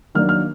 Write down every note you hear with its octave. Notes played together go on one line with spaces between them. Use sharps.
D#3 F#3 A#3 D4 F6
F6